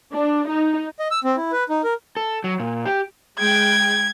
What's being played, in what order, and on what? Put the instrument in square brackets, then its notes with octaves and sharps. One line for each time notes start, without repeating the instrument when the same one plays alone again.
[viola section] D4
D#4
[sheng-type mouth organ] D#5
E6
C4
E4
B4
D#4
A#4
[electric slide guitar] A4
F#3
A#2
G4
[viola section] G#3 G5 [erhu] G#6